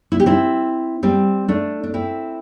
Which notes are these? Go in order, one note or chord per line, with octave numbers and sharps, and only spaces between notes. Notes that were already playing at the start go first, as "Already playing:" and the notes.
E4
G4
C4 E4
G3 C4
A3 D4
D4
C4 E4